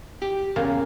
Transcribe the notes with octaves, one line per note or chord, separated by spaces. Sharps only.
G4
E2 A#2 C#3 A#3